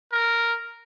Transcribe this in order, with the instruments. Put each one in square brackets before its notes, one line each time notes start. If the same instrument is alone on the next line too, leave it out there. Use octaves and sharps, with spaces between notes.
[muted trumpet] A#4